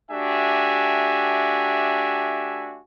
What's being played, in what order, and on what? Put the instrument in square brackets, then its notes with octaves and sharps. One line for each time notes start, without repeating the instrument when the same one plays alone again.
[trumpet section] A3 D4 F#4 G4 E5 G#5